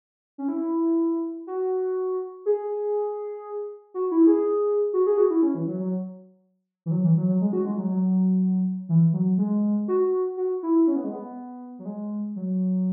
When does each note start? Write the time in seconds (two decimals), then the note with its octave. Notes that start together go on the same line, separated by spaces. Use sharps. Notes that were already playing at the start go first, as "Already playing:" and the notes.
0.38 C#4
0.48 E4
1.47 F#4
2.46 G#4
3.94 F#4
4.11 E4
4.27 G#4
4.93 F#4
5.06 G#4
5.18 F#4
5.30 E4
5.43 C#4
5.55 E3
5.67 F#3
5.80 F#3
6.86 E3
6.91 F#3
7.04 E3
7.17 F#3
7.28 F#3
7.41 G#3
7.53 F#4
7.65 G#3
7.78 F#3
7.90 F#3
8.89 E3
9.13 F#3
9.38 G#3
9.88 F#4
10.37 F#4
10.63 E4
10.87 C#4
10.96 B3
11.04 G#3
11.13 B3
11.79 F#3
11.85 G#3
12.36 F#3